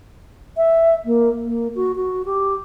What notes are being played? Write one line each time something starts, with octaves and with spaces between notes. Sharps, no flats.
E5
A#3
A#3
F#4
F#4
G4